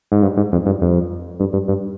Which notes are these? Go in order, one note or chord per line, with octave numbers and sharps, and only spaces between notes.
G#2
G2
G#2
F2
G2
F2
G2
G2
G2